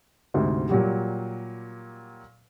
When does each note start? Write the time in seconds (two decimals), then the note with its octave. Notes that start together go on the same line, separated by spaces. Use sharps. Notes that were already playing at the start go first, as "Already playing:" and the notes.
0.34 D2 G#2 C3
0.69 A#2 F#3 G3